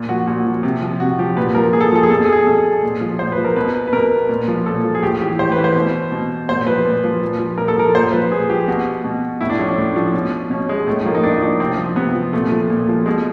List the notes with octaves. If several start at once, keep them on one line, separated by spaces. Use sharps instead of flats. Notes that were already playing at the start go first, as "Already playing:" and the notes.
Already playing: A#2
F3 F#4
A#2 F#4
F3
C3
F3
C3 F#4
F3 G4
A#2 B4
F3 A#4
A#2 G#4
A4
G#4
F3 A4
G#4
B2 A4
G#4
A4
G#4
B2 A4
A#2
F3
A#2 C5
B4
F3
A#4
B2 B4
B4
B2 A#4
A#2
F3
A#2 A4
F3
G#4
A2 G4
E3 G4
A2 C5
B4
E3
C5
B2
B2
A#2 C5
F3 B4
A#2
F3
A#2
F3
A#2 A#4
A4
F3 A#4
A#2 C5
F3 B4
A#2 G#4
F3 G4
B2 F#4
B2
A2 E4
D4
F3 C#4
D4
A2
F3
B2
B2 C#4
G#3
A2 A3
F3 A#3
D#4
A2 D4
D#4
F3 D4
C3 C4
F3
C3 B3
F3
A#2 A3
F3
A#2
F3
B2 G#3